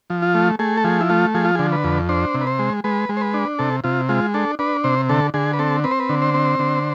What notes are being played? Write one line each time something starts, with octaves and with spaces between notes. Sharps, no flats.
F3
F4
A3
A3 G#4
A4
F3 G#4
E4
A3 F4
F3 G#4
F4
D3 G#4
B4
F2
D4 C5
C3
B4
C5
G#3
G#3 B4
G#3
C5
B4
D4
C3 A4
C3 F4
G#3 F4
D4 A4
D4 B4
C3 C5
D3 A4
D3 G#4
B4
C4 A4
C4 B4
C5
B4
D3
C5
C4
D3